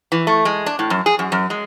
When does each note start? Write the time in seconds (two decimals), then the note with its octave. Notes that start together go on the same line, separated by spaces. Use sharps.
0.12 E3
0.27 A3
0.45 G#3
0.66 D4
0.79 A2
0.90 F#2
1.06 G#4
1.19 F#2
1.32 F#2
1.50 G#3